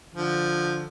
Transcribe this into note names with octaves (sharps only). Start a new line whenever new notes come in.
D3 F3